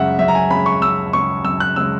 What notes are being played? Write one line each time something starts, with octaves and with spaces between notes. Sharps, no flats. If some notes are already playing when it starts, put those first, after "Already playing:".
Already playing: F#2 C#3 G#3 E5 F#5
F#2 E5
A#5
G#5
C#3 G#3 B5
C#6
F#2 E6
C#3 G#3 C#6
F#2 E6
F#6
C#3 G#3 E6